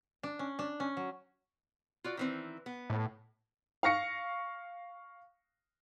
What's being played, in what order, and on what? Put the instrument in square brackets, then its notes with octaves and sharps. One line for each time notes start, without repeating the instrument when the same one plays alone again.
[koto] D4
C#4
D4
C#4
F#3
[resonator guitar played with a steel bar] F4 F#4 D5
D#3 E3 C4
B3
[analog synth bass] A2
[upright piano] F5 C#6 A#6 C#7